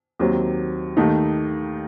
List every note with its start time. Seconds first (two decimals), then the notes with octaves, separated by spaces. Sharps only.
0.19 D#2 D#3 F#3 C4
0.97 D#2 D#3 A3 D#4